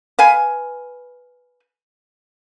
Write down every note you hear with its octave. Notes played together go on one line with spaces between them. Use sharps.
B4 F5 G#5